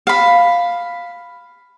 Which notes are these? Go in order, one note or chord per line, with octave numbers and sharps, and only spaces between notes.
F5 B5